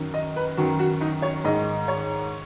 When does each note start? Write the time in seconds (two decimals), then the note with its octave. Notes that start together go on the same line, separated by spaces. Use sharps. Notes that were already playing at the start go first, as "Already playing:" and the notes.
Already playing: F#2 D#3
0.14 D#5
0.36 B4
0.57 F#2 D#3 F#4
0.79 F#4
1.01 D#4
1.22 C#5
1.44 G#2 D#3 D#5
1.88 C#5